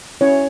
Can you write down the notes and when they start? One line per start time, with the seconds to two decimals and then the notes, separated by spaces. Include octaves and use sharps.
0.21 C#4 E4 C#5